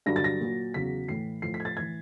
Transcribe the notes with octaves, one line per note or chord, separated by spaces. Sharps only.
G2 D3 F#3 A#6
A6
A#6
A#2 F#3
E2 C#3 F#3 B6
A2 E3 C7
A2 F3 C7
B6
G#6
A6
A2 E3 G#6